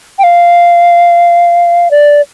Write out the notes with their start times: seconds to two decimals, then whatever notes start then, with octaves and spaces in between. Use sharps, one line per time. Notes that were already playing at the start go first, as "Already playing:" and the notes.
0.19 G5
0.23 F5
1.91 D5